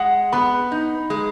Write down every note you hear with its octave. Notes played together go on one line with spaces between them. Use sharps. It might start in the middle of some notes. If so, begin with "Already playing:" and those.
Already playing: G#3 F#5
B3 B5
D#4
G#3